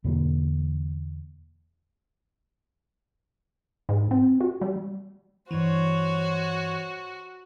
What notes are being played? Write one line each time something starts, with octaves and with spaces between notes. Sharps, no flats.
E2 B2 D3 A#3
G#2
C4
F#4
G3
G2 E3 F#4 C5 C#5